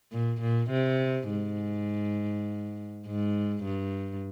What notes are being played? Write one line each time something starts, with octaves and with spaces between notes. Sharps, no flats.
A#2
A#2
C3
G#2
G#2
G2